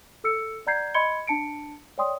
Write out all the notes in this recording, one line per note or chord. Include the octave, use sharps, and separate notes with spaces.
A4 E6 C#7
D5 F#5 A#5 G6 G#6 C7
D#5 B5 C6 G#6 C#7 G7
D4 A5 C#7 D7
C#5 D5 G5 C6 D#6